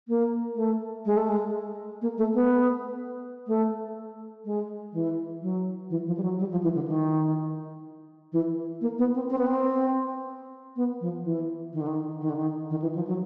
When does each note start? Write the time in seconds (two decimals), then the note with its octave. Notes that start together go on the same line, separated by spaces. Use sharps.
0.08 A#3
0.56 A3
1.05 G#3
1.17 A3
1.29 G#3
2.02 A#3
2.18 A3
2.34 B3
3.48 A3
4.45 G#3
4.93 E3
5.42 F#3
5.90 E3
6.06 F3
6.17 G3
6.23 F#3
6.39 G3
6.51 F3
6.63 E3
6.75 D3
6.88 D#3
8.33 E3
8.81 A#3
8.98 B3
9.14 C4
9.30 C4
9.38 B3
9.47 C4
10.76 B3
11.01 F3
11.24 E3
11.73 D#3
11.81 D3
11.87 D#3
12.21 D#3
12.29 D3
12.37 D#3
12.70 D#3
12.82 E3
12.95 F3
13.07 F#3